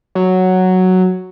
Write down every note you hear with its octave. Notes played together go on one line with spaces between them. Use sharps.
F#3